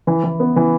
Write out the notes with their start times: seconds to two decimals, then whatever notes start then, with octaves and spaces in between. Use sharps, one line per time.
0.07 E3
0.24 E3
0.40 B3
0.56 E3